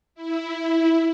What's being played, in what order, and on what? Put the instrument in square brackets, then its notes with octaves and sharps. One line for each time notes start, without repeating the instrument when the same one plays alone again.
[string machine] E4